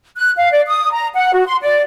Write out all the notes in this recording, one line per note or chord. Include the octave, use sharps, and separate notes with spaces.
F#6
F5
D5
D#6
A#5
F#5
F#4
C6
D5